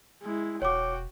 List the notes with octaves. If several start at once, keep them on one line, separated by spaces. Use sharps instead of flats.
G#3 E4
E1 F#4 C#5 G5 D6